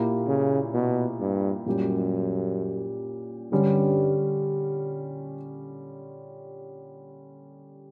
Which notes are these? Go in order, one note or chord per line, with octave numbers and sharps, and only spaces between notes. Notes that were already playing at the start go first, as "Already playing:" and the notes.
Already playing: A#2 A#3 E4 G4
C#3
B2
G2
F#2 A#2 G3 C#4 G4
G2 D3 G3 C#4